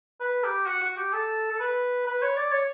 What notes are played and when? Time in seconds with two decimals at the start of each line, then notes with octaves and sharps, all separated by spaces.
0.20 B4
0.44 G4
0.67 F#4
0.82 F#4
0.97 G4
1.13 A4
1.52 A4
1.60 B4
2.06 B4
2.22 C#5
2.37 D5
2.52 C#5